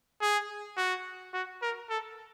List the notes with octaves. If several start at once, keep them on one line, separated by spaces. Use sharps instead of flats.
G#4
F#4
F#4
A#4
A4